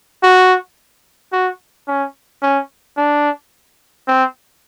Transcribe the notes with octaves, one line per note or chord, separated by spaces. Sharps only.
F#4
F#4
C#4
C#4
D4
C4